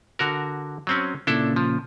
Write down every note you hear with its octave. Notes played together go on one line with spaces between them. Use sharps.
D3 F#4 A#4
F#3 C4 C#4
A#2 C#3 D4 E4 A4
F3